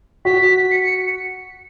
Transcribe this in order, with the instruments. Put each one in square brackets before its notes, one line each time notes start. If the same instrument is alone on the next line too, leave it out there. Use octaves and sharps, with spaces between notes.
[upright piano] F#4 [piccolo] B6
[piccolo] C#7
C#7